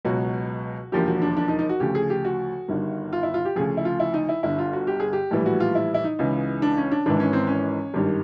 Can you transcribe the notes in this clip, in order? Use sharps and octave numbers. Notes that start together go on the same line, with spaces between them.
C#2 B2 F#3 F#4
E1 D#2 D3 F3 G4
F#4
D4
D4
D#4
D#4
F#4
D2 C#3 F3 G4
G#4
G4
F#4
G1 G2 D#3
F4
E4
F4
G4
D2 C#3 F3 G#4
E4
F4
E4
D#4
E4
G1 G2 D3 E4
F4
F#4
G4
G#4
G4
A#1 A2 E3 G3
F#4
F4
E4
E4
D#4
C#2 C#3 E3
D4
C#4
D4
G#1 G#2 E3 D4
C#4
C4
C#4
G#1 G2 D#3 G3